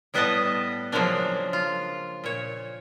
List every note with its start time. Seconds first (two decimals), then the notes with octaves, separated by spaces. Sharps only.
0.14 A2 G3 B3 B4 D#5 A5
0.92 C#3 F3 F#3 G#3 A#3 D4
1.53 F4
2.24 A#2 C#5